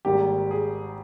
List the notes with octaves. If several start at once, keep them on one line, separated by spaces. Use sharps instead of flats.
G#1 G#2 G3 A#3 G4
G#4